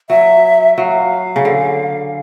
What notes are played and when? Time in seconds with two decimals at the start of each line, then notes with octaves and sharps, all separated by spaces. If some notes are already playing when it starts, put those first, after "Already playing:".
0.09 F#3 E5
0.77 F#3 F5
1.36 C#3
1.45 D3